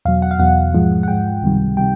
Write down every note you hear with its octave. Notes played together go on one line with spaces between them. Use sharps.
E2 B2 F#3 F5
F#5
F5
E2 B2 F#3 F#5
G#2 F3 G#3
F#5
G#2 F3 G#3 G5
C#2 C3 D#3 G3
C3 D#3 G3 G5